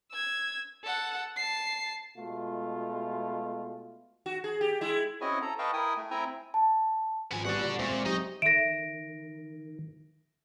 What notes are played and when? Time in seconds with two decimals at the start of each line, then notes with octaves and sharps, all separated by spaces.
0.12 E6 G#6
0.84 A4 F#5
1.37 A5 C7
2.17 B2 G#3 A3 F4
4.26 F#4
4.44 G#4
4.61 G4
4.81 G#3 E4
5.21 C4 C#4 E4 F#4 D#5 G#5
5.42 A4 A#5
5.59 B4 D#5 F5 G5 A5 C#6
5.73 E4 A#4 G5 G#5 D#6
5.97 A3
6.11 C4 E4 E5 G5 G#5 A#5
6.54 A5
7.31 G#1 F3 B3 G#5
7.45 G3 B3 F#4 A4 F#5
7.59 A#2 G3 F#4
7.79 A#2 G#3 C4 C5 E5 C#6
7.92 G#3
8.06 F#3 D#4 G4 D#5
8.42 D#3 A4 E5 A#6 D7